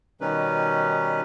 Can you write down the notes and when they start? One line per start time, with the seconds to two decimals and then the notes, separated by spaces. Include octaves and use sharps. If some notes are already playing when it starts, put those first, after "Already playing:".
0.21 B2 D#3 G3 C#4 D#4 B4